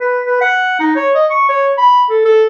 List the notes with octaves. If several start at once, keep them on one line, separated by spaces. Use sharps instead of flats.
B4
B4
F#5
D#4
C#5
D#5
C#6
C#5
B5
A4
A4